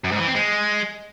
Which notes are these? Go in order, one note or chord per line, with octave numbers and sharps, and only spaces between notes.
F#2
G#2
E3
C4
G#3